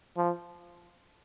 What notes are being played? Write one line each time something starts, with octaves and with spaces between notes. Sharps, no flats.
F3